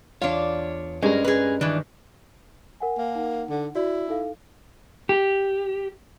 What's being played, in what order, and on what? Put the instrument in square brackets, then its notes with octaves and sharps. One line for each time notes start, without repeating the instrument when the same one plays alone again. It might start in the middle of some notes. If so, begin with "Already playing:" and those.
[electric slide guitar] E2 C#5 [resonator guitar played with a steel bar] D4 F5 [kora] F4
[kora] G2 G#3 [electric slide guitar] C#4 A#4
[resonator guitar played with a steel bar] G#4 B4
[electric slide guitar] D#3 [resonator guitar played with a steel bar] E3 D4
[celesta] A#4 F#5 G#5
[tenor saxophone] A#3
[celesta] D#4 F#5
[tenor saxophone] D3
[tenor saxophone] E4 [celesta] F#4 D5
[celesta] D#4 A4 F5
[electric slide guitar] G4